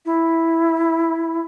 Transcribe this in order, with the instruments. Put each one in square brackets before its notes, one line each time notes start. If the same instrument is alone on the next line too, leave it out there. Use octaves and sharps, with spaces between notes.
[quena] E4